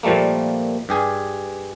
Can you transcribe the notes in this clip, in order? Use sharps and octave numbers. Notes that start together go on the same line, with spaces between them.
A#2 F3 G3 A3 A#3
G2 G4 G#4 G#5